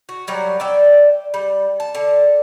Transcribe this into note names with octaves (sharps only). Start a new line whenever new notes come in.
F#4
F#3 G3 A#4
D5 E5 G5
G3
A5
D3